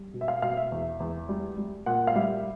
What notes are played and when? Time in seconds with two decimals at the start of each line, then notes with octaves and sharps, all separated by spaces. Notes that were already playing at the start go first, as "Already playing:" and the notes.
Already playing: G3
0.14 B2
0.21 E5
0.28 F5
0.42 B2 F5
0.57 E5
0.72 E2
1.00 E2
1.29 G3
1.58 G3
1.86 A#2 F#5
2.07 F5
2.16 G3 E5